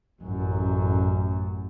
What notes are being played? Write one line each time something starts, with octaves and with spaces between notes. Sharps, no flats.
A1 F#2